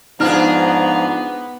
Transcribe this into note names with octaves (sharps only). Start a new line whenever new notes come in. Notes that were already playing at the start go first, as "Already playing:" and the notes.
G#2 F3 B3 D4 D#4 G#4 A#5 F6